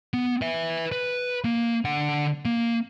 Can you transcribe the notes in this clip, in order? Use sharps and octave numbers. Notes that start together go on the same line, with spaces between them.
B3
B4 E5
B4
A#3
D3 F#5
A#3